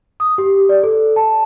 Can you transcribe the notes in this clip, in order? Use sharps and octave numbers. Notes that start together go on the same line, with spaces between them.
D#6
G4
D5
A4
A5